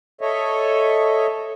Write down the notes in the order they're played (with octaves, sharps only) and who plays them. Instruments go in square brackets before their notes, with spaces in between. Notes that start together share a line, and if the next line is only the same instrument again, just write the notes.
[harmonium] A4 C#5 D#5 E5